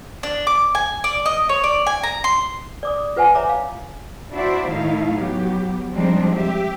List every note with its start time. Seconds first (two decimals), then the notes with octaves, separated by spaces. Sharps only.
0.23 D4
0.47 D6
0.75 G#5
1.04 D5
1.26 D#5
1.49 C#5
1.64 D5
1.87 G#5
2.03 A#5
2.24 C6
2.83 D5 D6 D#6
3.16 F4 B4 F#5 G#5
3.35 C#5 E5 A#5 B5 D6
3.49 F5
4.32 D4 E4 F#4 C5 D5 E5
4.69 A2 D#3 A3 D#4 E4 F5
5.15 F#3 B3 G4
5.92 F3 G3 G#3 C4 D4 D#4
6.33 G4 E5